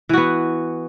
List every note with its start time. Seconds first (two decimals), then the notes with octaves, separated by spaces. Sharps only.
0.09 E3
0.13 F#4
0.17 B3